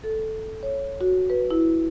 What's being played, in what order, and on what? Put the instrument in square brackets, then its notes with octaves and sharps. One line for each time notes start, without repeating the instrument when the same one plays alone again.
[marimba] A4
C#5
F#4
B4
E4